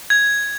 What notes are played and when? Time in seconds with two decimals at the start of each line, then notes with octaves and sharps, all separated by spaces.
0.10 G#6